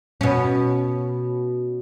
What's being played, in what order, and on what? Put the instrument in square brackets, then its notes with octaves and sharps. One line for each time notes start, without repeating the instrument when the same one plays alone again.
[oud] B2 C#4